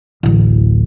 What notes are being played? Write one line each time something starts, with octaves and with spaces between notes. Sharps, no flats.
D1 A1